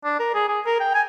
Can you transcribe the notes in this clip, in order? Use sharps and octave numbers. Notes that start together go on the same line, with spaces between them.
D4
A#4
G#4
G#4
A#4
G5
G#5